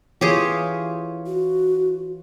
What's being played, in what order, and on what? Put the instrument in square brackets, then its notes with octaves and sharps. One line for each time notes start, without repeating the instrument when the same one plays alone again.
[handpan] E3 F4 C#5 [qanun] G4 G#4
[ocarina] F#4